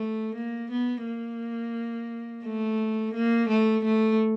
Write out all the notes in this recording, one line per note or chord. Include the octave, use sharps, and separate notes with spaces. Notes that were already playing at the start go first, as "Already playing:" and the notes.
Already playing: A3
A#3
B3
A#3
A3
A#3
A3
A3